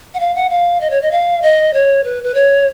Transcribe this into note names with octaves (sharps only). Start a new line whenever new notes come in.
F#5
F5
F#5
F5
D#5
C#5
D#5
F5
D#5
C#5
B4
B4
C#5